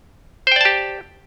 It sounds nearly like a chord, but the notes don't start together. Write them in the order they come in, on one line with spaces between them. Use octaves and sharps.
C5 G5 D5 A5 G4